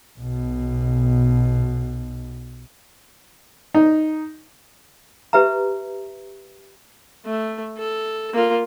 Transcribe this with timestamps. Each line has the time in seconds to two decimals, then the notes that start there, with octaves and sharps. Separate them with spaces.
0.19 B1 B2
3.75 D#4
5.33 G4 B4 E5 A#5
7.26 A3
7.78 A4
8.34 A#3 F4